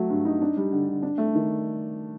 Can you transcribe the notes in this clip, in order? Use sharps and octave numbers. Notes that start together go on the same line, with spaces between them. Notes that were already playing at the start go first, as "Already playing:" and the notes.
Already playing: F#3 A3
G2
D#4
D4
G3
D3
D3
D4
A3
D#3